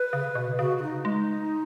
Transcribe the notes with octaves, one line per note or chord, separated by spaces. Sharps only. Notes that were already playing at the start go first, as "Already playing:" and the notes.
Already playing: B4
C#3
B2
C#3 F#4
F#4
D#4
G#3 D#4